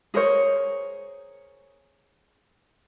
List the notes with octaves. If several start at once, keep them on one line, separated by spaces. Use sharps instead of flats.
G#4 A#4 C5 C#5